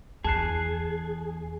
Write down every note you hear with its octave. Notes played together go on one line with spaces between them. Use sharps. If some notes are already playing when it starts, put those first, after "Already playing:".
E2 G#4 A5 F#6 C7